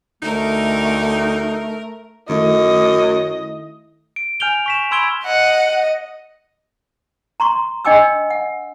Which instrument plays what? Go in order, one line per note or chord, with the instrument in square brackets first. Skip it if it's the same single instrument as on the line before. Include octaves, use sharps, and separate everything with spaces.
[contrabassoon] D2 [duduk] A3 [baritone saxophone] D#4 [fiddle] A#4
[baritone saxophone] F#2 [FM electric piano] D#3 A3 E4 [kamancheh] D#5
[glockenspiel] D7
G#5 F6 G6 D7 F7 G7
C#6 B6 E7
B5 C6 E6 G#6 D7 G7
[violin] D#5 [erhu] F#5
[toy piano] A#5 C6 C#6
D4 D#5 G5 G#5 D6 E6
F#5